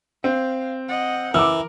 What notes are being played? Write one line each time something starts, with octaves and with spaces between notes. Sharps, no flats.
C4 F5
D#5 F#5
E3 A#4 D6 E6